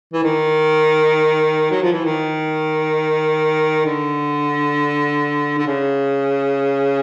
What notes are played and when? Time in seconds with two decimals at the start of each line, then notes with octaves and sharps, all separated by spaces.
0.14 E3
0.23 D#3
1.71 F#3
1.83 F3
1.93 E3
2.05 D#3
3.86 D3
5.58 D3
5.67 C#3